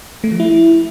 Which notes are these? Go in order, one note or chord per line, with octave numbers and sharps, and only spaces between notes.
A3
F3
E4